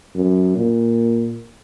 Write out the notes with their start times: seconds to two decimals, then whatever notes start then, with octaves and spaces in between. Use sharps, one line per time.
0.15 F#2
0.56 A#2